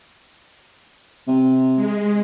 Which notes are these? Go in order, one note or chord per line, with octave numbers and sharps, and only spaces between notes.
C3
G#3